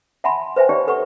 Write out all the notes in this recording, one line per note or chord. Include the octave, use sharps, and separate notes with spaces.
E5 F#5 G#5 A5 B5 C6
B4 C5 E5 G5 G#5
D#4 G4 C#5 D5
A4 B4 F#5 C#6